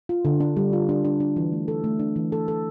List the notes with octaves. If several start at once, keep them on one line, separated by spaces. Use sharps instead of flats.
F4
D3
D4
G3
F4
D4
D4
D4
E3
A3
A4
A3
D4
E3
A4
A4